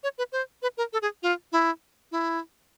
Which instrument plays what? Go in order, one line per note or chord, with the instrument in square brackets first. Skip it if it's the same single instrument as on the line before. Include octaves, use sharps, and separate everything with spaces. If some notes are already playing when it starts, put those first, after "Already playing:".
[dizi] C#5
B4
C5
B4
A#4
A4
G#4
F4
E4
E4